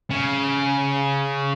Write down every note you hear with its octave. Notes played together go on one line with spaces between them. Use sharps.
C#3